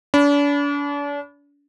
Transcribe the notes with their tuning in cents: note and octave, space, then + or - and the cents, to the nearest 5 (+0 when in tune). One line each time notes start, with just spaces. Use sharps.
D4 -40 B5 +0